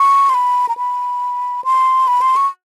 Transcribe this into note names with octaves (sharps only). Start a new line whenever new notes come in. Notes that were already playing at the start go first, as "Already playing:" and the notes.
Already playing: C#6
C6
B5
A#5
B5
C6
B5
C6
C#6